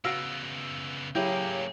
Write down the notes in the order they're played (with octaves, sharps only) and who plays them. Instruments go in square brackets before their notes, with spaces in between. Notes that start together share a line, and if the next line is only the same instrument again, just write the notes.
[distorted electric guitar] C#3 B3 [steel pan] F#4 F5 [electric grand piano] E6 A#6 D7
[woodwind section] C#3 F#3 [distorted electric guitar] A#3 G#4 [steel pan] E4 [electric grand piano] G4 G5 G6